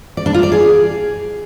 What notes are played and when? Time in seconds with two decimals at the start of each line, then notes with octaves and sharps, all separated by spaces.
0.17 D5
0.26 D4
0.34 F4
0.43 D5
0.52 G#4